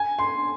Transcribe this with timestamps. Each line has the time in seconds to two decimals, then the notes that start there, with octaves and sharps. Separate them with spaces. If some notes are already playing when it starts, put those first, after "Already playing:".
Already playing: G#5
0.19 C6